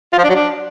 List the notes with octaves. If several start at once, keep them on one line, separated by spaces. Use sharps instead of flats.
F4
F3
D4
F#3
D4